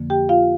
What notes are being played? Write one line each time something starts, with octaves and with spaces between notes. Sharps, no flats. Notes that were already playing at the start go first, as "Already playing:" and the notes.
Already playing: F2 D3 F3 A#3
G4 G5
F4 F5